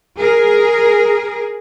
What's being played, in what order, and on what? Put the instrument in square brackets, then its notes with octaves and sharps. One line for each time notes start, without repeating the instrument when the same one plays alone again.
[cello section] G#4 A#4